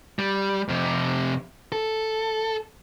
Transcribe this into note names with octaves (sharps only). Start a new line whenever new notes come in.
G3
F2 C3
A4